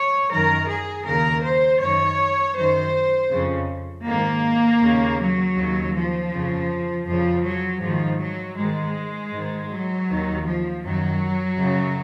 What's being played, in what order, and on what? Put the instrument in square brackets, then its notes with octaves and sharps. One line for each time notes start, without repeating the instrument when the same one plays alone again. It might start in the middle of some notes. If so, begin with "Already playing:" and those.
Already playing: [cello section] C#5
F#2 D#3 A#4
G#4
D#2 C#3 A#4
C5
F#2 D#3 C#5
F#2 D#3 C5
F2 C#3
G#2 D#3 A#3
D#2 C#3
F#3
D#2 C#3
F3
F2 C#3
F2 C#3 F3
F#3
G#2 D#3 F3
F#3
G#2 D#3 G#3
G#2 D#3
F#3
D#2 D#3
F3
F#2 D#3 F#3
F#2 C#3